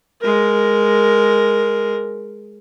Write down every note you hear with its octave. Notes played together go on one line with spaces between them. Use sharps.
G#3 A#4